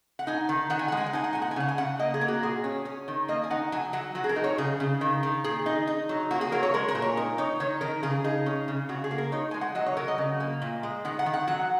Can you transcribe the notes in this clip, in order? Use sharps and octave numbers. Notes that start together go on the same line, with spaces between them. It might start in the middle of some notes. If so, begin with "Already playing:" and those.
F#5
D#4 G#5
D#3
D#3 F#5
G#5
F#5
G#3
G#5
F#5
D#4 G#5
F#5
A#2 G#5
F#5
G#5
C#3 F#5
G#5
C#3 F#5
A#3 D#5
G#4
A#3
F#4
A#2 G#4
C#4
C#4
D#3
A#3 D#5
G#5
D#4 F#5
F#3 G#5
F#3 F#5
F#3 F#4
G#4
A#4
D#4
C#5
C#3 G#4
C#3
D#3
D#3
A#2 G#4
D#4
D#4
F#3
A#3 F#4
G#4
F#3 A#4
C#5
G#3 A#4
A#4
A#2
C#5
D#4 A#4
D#4 C#5
D#3 C#5
D#3 A#4
C#3 G#4
D#4 G#4
C#4
C#3
C#3 F#4
G#4
A#3
A#4
D#4 C#5
G#3 G#5
F#5
F#3 D#5
C#5
F#3 A#4
D#5
C#3
A#3
A#2
G#3
D#3 F#5
F#5
D#3
F#5
F#3 F#5